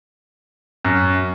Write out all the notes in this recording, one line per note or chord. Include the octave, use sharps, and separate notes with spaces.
F#2